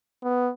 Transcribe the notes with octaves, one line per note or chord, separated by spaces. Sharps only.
B3